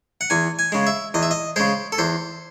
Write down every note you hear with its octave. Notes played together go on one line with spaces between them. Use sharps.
F#5
E2 G#5
G#5
C#3 G#3
E5
E2 D#5
E5
D#5
C#3 G#3 C5
A4
E2 C5